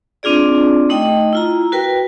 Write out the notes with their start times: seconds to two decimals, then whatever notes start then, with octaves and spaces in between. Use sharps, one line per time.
0.23 C4 D4 F4 G#4 D5
0.89 A3 D#4 D#5 G5
1.33 E4 F4 A#5
1.72 F#4 A#4 B4 G5